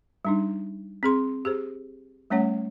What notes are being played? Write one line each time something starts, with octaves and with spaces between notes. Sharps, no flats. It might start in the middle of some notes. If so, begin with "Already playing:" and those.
G3 D4 D#4
C4 G#4 C6
G4 G#4 C5
G3 A3 C#4 C#5 F#5